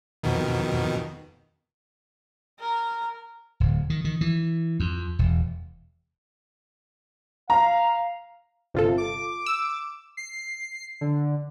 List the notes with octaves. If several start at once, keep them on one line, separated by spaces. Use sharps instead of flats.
F2 B2 D#3
A#4
D1
D#3
D#3
E3
F2
E1
F5 A#5
G1 C3 F4 A4
D6
E6
C7
D3